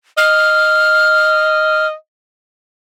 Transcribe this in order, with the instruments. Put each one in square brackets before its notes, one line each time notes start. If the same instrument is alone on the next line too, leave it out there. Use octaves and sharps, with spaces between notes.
[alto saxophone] D#5 [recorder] F6